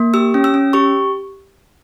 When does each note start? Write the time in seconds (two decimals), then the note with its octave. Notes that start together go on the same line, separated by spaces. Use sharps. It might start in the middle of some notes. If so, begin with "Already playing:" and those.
Already playing: A#3
0.14 G4 E6
0.34 C#4
0.44 E6
0.54 C#4
0.73 G4 C#6